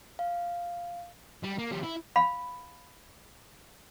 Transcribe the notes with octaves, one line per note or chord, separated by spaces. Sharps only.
F5
G3
A#3
F3 G3
E4
F5 B5